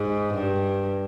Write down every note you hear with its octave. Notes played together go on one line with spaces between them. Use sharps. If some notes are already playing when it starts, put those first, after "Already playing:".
Already playing: G#2
G2